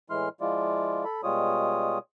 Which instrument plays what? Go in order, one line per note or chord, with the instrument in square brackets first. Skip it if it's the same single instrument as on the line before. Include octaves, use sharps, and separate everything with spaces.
[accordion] A2 E3 G#3 E4 C6 F6
F3 G#3 E4 F4 D5
A4 B5
B2 G3 G#3 F4 C#5 D#6